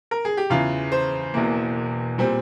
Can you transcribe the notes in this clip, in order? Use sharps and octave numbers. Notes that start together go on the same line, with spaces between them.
A#4
G#4
G4
E2 C#3 E3 F4
C5
E1 E2 E3 A#3
A#2 G3 C4